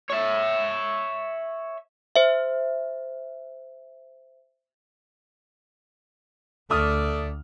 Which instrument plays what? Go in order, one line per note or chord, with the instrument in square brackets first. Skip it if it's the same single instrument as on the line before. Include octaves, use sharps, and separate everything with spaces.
[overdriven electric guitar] C#5 E5
[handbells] C5 E5
[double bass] D2 [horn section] A3 D5 [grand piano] D#6 F6